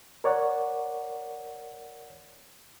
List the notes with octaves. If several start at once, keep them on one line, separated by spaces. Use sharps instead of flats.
A#4 C#5 D5 F#5